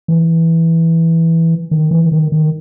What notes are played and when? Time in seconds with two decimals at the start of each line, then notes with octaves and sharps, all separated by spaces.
0.08 E3
1.71 D#3
1.91 E3
2.12 D#3
2.32 D#3